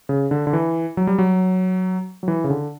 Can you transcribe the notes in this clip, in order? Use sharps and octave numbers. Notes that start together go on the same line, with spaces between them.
C#3
D3
D3
E3
F#3
G3
F#3
F#3
E3
C#3
D3